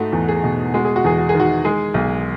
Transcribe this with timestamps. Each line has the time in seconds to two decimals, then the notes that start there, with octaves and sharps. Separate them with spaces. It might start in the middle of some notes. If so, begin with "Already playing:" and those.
Already playing: G#2 A3 F#4
0.13 E2
0.29 G#4
0.44 B2
0.74 G#3 F#4
0.85 G#4
0.96 F#4
1.04 E2 G#4
1.18 F#4
1.29 G#4
1.34 D#3
1.40 F#4
1.65 G#3 G#4
1.94 B1